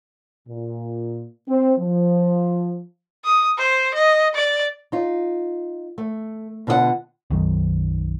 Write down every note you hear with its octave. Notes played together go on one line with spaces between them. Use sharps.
A#2
C4
F3
D#6
C5
D#5
D5
D#4 F4
A3
B2 D3 F4 D5 F#5
B1 F#2 D#3 F#3